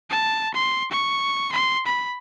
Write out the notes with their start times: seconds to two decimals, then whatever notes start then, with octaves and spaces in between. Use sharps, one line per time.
0.10 A5
0.54 C6
0.91 C#6
1.52 C6
1.86 B5